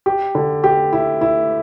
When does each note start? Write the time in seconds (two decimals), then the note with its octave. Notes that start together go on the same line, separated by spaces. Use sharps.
0.06 G4
0.35 D3
0.64 G4
0.93 E4
1.21 E4